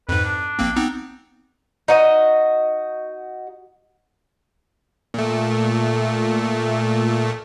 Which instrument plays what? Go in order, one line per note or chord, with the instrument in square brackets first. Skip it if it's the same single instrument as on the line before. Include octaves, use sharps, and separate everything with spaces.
[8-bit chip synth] F2 G#2 [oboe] B4
[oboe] D4
[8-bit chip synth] A#1 A#3 C4
B3 C4 D#4
[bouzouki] D#4 F#4 D#5
[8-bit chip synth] A#2 A3